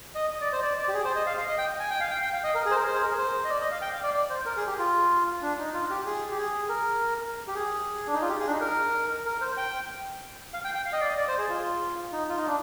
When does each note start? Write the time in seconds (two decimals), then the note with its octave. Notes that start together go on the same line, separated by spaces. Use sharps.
0.15 D#5
0.31 D#5
0.41 D5
0.53 C5
0.62 D5
0.78 D5
0.88 G4
0.94 G#4
1.05 C5
1.15 D#5
1.26 F5
1.37 F5
1.48 D#5
1.58 G5
1.80 G#5
1.91 G5
2.00 F5
2.10 G5
2.22 G5
2.33 F5
2.44 D#5
2.55 A#4
2.66 G#4
2.71 C5
2.76 A#4
2.87 C5
2.95 G#4
3.02 A#4
3.18 C5
3.44 D#5
3.50 D5
3.61 D#5
3.71 F5
3.82 G5
3.93 F5
4.03 D5
4.14 D5
4.30 C5
4.46 A#4
4.57 G#4
4.67 G4
4.79 F4
5.42 D4
5.59 D#4
5.74 F4
5.90 G4
6.06 G#4
6.31 G4
6.38 G#4
6.69 A#4
7.48 G4
7.55 G#4
8.07 D4
8.14 D#4
8.22 F4
8.29 G4
8.40 G#4
8.47 D4
8.51 D#4
8.61 A#4
9.26 A#4
9.41 C5
9.57 G5
10.54 F5
10.64 G5
10.74 G5
10.85 F5
10.93 D#5
11.01 D5
11.08 D#5
11.17 D5
11.28 C5
11.39 G#4
11.50 F4
12.12 D#4
12.29 F4
12.38 D#4
12.47 D4